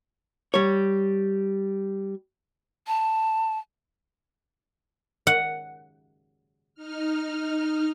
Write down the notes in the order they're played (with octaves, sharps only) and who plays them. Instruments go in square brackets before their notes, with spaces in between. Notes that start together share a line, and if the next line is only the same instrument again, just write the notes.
[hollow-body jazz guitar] G3 C#5
[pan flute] A5
[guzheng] F#5
[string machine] D#4 F6